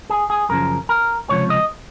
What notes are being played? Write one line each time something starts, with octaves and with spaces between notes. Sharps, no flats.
G#4
G#4
F#2 C#3 F3 A#4
A#4
C#2 C3 F3 C#5
D#5